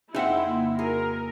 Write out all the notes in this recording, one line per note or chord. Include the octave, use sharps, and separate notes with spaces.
F2 G#3 C4 D#4 E4 E5 F#5 G#5
F2 C#3 A#3
F#4 G#4 A#4